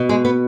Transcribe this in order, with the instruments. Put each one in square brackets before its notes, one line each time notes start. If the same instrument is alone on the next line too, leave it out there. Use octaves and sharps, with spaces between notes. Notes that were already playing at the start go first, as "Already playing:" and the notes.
Already playing: [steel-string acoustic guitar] B2
G#3
B3